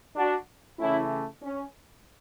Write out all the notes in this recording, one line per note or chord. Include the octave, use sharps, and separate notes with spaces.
D4 F#4
C#3 E3 A3 C#4 E4
C#4